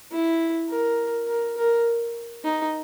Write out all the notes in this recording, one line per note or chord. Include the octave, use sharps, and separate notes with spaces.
E4
A#4
A#4
A#4
D#4